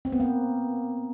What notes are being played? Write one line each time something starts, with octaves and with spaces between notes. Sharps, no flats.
C4
B3
A#3